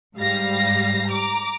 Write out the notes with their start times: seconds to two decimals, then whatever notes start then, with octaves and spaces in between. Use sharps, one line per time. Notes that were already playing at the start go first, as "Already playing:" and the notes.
0.17 G#2 G3 F5 A#6
1.07 A#5 D6